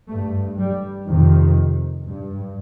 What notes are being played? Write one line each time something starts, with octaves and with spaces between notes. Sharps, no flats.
G2 A3
G3
F2 C3 D#3
G2